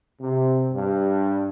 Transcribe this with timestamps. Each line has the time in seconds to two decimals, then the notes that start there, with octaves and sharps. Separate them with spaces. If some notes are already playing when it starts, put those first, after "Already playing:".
0.21 C3
0.73 G2